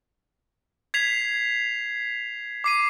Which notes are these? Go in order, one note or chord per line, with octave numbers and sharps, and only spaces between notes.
G#6 B6 C7 F7
D6 C7 D#7